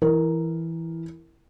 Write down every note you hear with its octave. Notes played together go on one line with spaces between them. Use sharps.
E3 E4 A#4